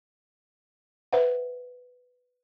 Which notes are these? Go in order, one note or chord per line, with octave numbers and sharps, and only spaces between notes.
B4 C5 E5 F#5